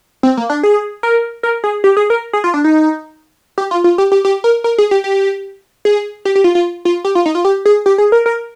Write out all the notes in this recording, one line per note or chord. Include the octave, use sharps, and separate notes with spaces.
C4
A#3
D4
G#4
A#4
A#4
G#4
G4
G#4
A#4
G#4
F4
D4
D#4
G4
F4
F4
G4
G4
G4
A#4
A#4
G#4
G4
G4
G#4
G4
G4
F4
F4
F4
G4
F4
D#4
F4
G4
G#4
G4
G#4
A#4
A#4